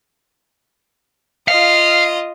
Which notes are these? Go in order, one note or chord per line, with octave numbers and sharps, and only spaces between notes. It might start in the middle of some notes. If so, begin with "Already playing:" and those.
F4 D#5 F5